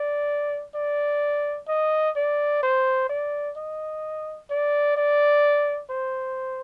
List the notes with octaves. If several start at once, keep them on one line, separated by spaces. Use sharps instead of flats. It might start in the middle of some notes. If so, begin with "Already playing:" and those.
Already playing: D5
D5
D#5
D5
C5
D5
D#5
D5
D5
C5